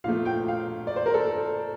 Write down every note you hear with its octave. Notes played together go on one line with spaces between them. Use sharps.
A#2 F3 A3 F5
G5
F5
D5
C5
A#4
A4